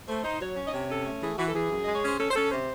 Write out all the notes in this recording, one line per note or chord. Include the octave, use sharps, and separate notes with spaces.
A3 C5
D#4 C5
F#3 C#5
C#4
D#5
C3 C#5
C#4 A4
A3
E3 G#4
E3 F#4
A4
E3 G#4
F#2
G#3 D#5
C#5
C#4 C5
C#4 A4
C5
C#4 A4
C3 C5